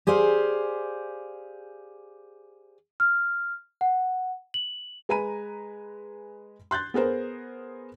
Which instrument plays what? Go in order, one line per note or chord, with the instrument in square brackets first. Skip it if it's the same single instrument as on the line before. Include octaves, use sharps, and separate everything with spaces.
[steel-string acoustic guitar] G4 G#4 C5 D5 F5
[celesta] F6
F#5
F#7
[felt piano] G#3 B4 G#5 A#5 B5 D#7
C6 F#6 G6 A6
B3 G#4 A#4 C5